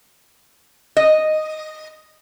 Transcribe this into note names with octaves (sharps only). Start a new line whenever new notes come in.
D#5